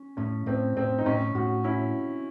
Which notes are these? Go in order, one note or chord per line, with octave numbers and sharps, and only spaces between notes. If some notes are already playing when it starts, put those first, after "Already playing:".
Already playing: C#4
A2 C#4
A2 C4
A2 C4
D#4
A2 C#4
A2 F#4
C#4 E4